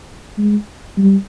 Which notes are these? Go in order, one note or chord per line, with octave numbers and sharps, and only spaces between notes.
G#3
G3